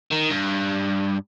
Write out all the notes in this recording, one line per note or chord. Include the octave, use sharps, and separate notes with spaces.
D#3
G2